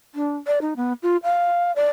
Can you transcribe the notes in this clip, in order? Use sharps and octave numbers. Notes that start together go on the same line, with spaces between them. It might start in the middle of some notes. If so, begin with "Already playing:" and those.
D4
D5
D#4
B3
F4
F5
D5